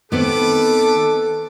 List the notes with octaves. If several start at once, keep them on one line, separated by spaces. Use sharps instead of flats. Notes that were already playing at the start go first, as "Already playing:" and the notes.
D#3 A3 B3 C4 A4 B4 D6